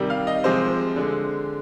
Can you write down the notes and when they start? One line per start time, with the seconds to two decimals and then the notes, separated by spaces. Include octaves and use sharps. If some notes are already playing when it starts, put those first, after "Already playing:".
Already playing: C3 D#3 G3
0.10 F5
0.27 D#5
0.44 C3 F3 G#3 C5
0.96 D3 G#3